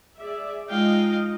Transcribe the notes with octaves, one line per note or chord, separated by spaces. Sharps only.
G#4 D5 E5
G#3 D#4 F4 D#5 F5 G5